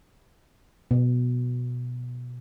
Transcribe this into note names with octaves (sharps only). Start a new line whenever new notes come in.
B2